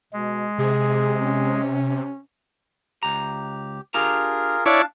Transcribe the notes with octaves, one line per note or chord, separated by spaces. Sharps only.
B2 G#3
C3 G#4
C#4
C#2 G4 A#5
D4 F4 G4 G#4 A#4 A#5
D4 E4 C#5 D5 F5 A5